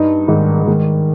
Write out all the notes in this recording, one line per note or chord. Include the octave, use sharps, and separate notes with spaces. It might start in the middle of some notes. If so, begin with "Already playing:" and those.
Already playing: G2 D#4
G#2 D#3
D#3 G#3